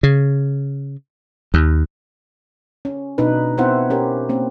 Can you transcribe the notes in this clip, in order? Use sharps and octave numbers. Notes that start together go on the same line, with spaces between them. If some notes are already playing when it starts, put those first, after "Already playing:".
C#3
D#2
C#4
B2 D4 D#4 B4
B3 C4 E4 C5 E5 F#5
C#4 G4 A#4
A#3 C4 C#4